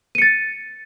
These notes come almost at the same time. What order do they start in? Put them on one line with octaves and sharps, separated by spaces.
D#7 C#7 A6